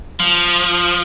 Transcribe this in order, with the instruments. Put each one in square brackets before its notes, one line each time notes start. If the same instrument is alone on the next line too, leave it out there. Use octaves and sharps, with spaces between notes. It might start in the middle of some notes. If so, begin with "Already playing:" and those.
[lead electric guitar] F3